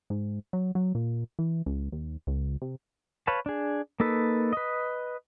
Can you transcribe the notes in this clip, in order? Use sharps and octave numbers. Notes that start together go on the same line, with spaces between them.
G#2
F#3
F#3
A#2
E3
C#2
D#2
C#2
C3
B4 C#5 F5 A5
D4 G#4
A#3 D#4 A4 B4
B4 D#5